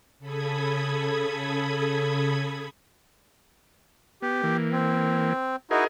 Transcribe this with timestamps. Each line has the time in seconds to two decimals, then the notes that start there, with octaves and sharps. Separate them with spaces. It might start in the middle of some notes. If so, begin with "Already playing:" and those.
0.19 C#3 A4 B5 D#6 G#6
4.22 B3 G4
4.44 E3 A#3
4.72 C4
5.71 D#4 E4 F#4 G#4 A#4 D#5